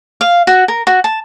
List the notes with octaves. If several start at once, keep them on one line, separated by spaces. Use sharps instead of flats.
F5
F#4
A#4
F#4
A5